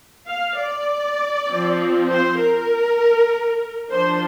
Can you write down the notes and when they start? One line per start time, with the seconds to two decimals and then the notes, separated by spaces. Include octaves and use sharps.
0.27 F5
0.57 D5
1.48 F3 C4
2.10 C5
2.39 A#4
3.91 F3 D4 C5